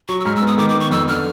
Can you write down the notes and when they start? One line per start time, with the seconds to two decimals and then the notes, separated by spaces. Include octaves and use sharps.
0.09 F#3 C#6
0.20 E6
0.25 G#2 F6
0.36 E6
0.42 B3
0.47 D#6
0.58 D#3 D6
0.69 D6
0.75 B3
0.80 C#6
0.91 F2 E6
1.07 D3 F6